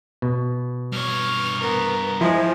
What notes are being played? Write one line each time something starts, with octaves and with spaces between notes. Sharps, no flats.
B2
G2 C#5 F6
B3 A#4
F3 G#3 E4